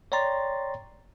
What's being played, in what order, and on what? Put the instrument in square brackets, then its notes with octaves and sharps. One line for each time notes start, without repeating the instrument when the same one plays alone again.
[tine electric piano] C#5 D5 G5 A#5 C6 A6